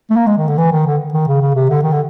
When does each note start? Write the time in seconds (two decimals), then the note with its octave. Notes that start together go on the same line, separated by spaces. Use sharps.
0.10 A3
0.16 A#3
0.27 G#3
0.37 D#3
0.48 D3
0.58 E3
0.72 D#3
0.86 D3
1.13 D#3
1.27 C#3
1.41 C#3
1.55 C3
1.69 D3
1.83 D#3
1.92 D3